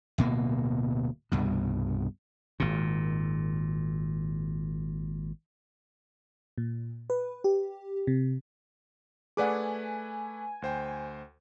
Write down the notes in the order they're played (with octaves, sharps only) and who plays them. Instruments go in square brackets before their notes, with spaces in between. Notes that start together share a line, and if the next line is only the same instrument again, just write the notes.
[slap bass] D1 B2 A#3
C2 G2 B2
G#1 A#2
[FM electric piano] A#2
B4
G4
C3
[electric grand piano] A3 B4 D6 [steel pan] G#4 D5 F#5 [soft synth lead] G#5
[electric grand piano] D2 C5 G5